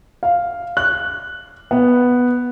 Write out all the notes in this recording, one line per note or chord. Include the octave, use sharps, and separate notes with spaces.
F5
F#6
B3